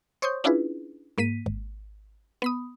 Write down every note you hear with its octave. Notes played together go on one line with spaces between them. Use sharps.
C5 C#5 C6 C#6 D#6 G6
C#4 D4 E4 F4 G#4 B4
G#2 A#3 B6 D#7
G#1
B3 B5 D#6